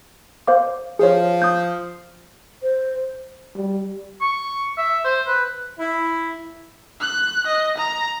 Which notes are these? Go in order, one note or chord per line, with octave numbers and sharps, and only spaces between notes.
C5 F5 D6
F3 G#4 C#5
D#6 G6
C5
G3
C#6
E5
C5
B4
E4
F#6
D#5
A#5